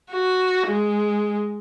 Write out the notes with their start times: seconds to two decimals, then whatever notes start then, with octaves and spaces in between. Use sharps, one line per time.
0.11 F#4
0.67 G#3